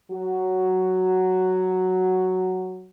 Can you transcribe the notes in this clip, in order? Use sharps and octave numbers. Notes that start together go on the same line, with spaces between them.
F#3 F#4